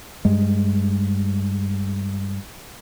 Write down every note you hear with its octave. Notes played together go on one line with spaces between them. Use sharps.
G2 G#3